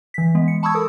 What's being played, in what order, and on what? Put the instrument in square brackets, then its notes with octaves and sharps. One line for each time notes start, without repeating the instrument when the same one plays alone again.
[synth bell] E3 B6
G#3 B3
C#7
A5 B5 C#6 D#6 E6 G#6
A4 A#4 D#6